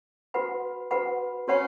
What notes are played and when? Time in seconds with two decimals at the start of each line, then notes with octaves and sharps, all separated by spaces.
0.34 F#4 B4 F#5 B5
0.91 F#4 B4 F#5 B5
1.48 C#4 F#4 C#5 F#5 B5